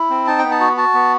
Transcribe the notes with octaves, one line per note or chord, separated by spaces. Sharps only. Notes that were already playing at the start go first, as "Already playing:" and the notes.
Already playing: E4
C4
D#4 A5
B3 G5
A5
F#4
F#4 A5
B3